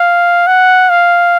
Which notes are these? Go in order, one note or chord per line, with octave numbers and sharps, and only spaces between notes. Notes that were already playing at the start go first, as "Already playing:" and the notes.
Already playing: F5
F#5
F5